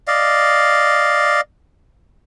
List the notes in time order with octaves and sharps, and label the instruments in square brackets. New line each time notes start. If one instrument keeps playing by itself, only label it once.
[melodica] D5 D#5 F5